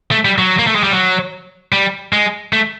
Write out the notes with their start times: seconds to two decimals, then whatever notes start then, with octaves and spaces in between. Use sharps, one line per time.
0.11 A3
0.25 G3
0.38 F#3
0.59 A#3
0.67 A3
0.75 G#3
0.83 G3
0.92 F#3
1.72 G3
2.13 G#3
2.53 A3